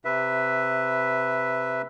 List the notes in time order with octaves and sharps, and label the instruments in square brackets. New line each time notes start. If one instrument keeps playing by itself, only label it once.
[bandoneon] C3 B4 E5